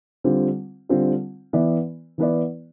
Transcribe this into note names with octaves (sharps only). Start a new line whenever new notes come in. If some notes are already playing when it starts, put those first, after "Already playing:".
D3 G3 C4 F4
D3 G3 C4 F4
E3 B3 E4 B4 D5
E3 B3 E4 B4 D5